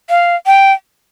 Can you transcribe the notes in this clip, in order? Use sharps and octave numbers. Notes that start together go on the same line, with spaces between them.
F5
G5